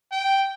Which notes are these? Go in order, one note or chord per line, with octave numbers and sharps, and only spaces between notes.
G5